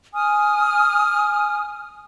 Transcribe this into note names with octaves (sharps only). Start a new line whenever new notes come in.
G#5 D#6 F6